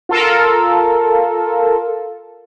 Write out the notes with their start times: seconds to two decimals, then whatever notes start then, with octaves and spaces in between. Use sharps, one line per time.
0.09 F4 A4 A#4